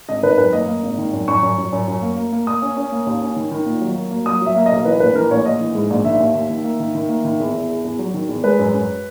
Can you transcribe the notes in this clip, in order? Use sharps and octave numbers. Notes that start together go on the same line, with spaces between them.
G#1 D#5
D#3 B4
F#2 B4
A#3 D#5
A#3
G#1
D#3
F#2
F#2 C#6
F#2
F#2
F#2
F#2
A#3
A#3
A#3
A#3 D#6
C#4
C#4
A#3
D#2
C#4
D#3
D#3
A#2
F#3
A#3
A#3
F#3 D#6
F#3 E5
A#3
D#5
B1
E3 B4
A#1 B4
E3 A#4
A#1 C#5
A#1 D#5
E3
G#2
A#1
D#3 E5
D#2
D#2
D#3
A#3
D#3
D#3
A#3
D#3
E2
E2
E2
E2
F#3
D#3
E2
G#3 B4
F#2
F#2